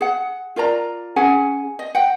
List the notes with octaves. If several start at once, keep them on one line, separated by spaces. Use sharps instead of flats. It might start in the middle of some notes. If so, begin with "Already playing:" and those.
G#4 F#5
F4 A#4 D5 A#5
C#4 G#4 F#5 G#5
D#5
F#5 G5